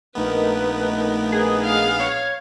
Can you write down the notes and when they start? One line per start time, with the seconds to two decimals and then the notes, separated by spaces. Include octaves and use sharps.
0.15 A#1 A3 B3 D#4 A#4 B4
1.32 G#4 B4
1.65 F5
2.00 C#5